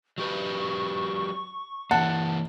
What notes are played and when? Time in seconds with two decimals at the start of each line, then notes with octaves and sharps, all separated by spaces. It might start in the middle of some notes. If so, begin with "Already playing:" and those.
0.18 F#3 G4 B4 C#6
1.91 E3 A#3 F#5 A5